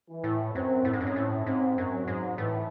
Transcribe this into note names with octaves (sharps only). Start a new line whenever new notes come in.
E3
A2
F#2 C4
A2
G#2
F#2 C#4
G#2
A2
G#2 C4
F#2
F#3
G#2
A2 E3